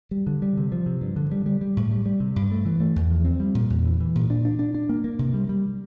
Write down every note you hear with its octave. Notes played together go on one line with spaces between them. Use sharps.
G3
D3
G3
C3
F3
C3
G2
D3
G3
G3
G3
A2
G3
G3
C3
G2
A3
E3
A3
E2
F3
C4
G3
A#2
E2
E3
E3
A#2
D4
D4
D4
D4
A#3
A#3
C3
G3
G3